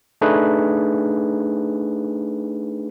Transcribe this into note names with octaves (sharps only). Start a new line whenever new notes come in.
A3 D4 D#4 G#4 B4